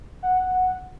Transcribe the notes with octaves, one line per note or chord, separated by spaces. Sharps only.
F#5